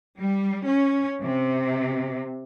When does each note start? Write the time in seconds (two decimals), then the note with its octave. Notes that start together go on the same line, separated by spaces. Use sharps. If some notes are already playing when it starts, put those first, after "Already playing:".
0.18 G3
0.67 C#4
1.22 C3